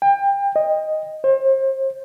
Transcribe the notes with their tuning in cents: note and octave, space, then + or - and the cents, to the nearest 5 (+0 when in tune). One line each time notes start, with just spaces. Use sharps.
G5 +30
D#5 +0
C5 +35